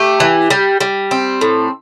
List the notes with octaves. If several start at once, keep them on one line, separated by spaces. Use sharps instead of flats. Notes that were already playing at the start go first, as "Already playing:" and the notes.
Already playing: A3 G4
E3
G3
G3
C4
A2